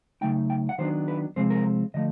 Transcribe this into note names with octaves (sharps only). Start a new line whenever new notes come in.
C#3 F#3 A3 D#4 G5
G5
F#5
D#3 F#3 B3 D4 C5
B4
C3 F3 G#3 C4 C5
A#4
D3 F3 A3 D#5